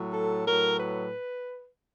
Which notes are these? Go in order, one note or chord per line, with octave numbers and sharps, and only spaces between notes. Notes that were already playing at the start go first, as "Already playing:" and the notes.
Already playing: A2 F#3
A4
A2 F#3 A#4
B4